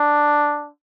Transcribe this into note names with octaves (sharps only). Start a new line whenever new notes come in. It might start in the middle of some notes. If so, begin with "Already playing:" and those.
Already playing: D4